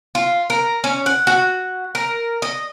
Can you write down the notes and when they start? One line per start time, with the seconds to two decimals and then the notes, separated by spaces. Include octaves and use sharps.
0.15 F4
0.50 A#4
0.84 C#4
1.06 F#5
1.27 F#4
1.95 A#4
2.42 D#5